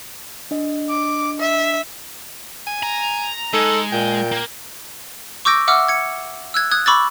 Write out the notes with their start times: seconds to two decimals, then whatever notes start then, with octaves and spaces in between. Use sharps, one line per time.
0.51 D4 D#5
0.89 D6
1.40 E5
2.67 G#5
2.83 A#5
3.53 G#3 D#4 A4
3.92 A#2 G5
4.32 A#3
5.45 C#6 D6 E6 G6 A#6 D7
5.68 E5 F#5 D6 E6 F6
5.88 G#6 C#7
6.54 E6 F#6 G#6
6.71 D#6 F#6 G#6
6.86 B5 C#6 D6 E6 G#6 A6